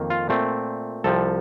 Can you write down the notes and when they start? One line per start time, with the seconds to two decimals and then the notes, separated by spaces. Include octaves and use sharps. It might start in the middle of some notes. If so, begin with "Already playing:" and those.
Already playing: F2 D#3 A#3
0.10 F4
0.29 A#2 A3 C4
1.04 C2 C3 F3 A4